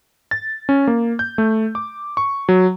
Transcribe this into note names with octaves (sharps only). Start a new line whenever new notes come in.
A6
C#4
A#3
G6
A3
D6
C#6
F#3